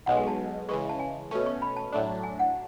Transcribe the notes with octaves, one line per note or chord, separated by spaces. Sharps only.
B1 B2 G#3 F#5
G#5
A5
C#3 E3 G#3 C#6
A5
G#5
B2 A3 C#4 A5
C#6
B5
A5
A2 F#3 A3 D4
G#5
F#5